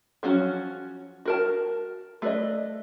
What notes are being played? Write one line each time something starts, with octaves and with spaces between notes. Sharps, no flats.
F3 F#3 C#4 F#4
F#4 A#4 A5
A3 G#4 B4 D5 D#5